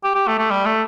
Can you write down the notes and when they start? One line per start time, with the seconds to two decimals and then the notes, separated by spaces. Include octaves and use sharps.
0.04 G4
0.14 G4
0.27 A3
0.38 A3
0.50 G3
0.66 A3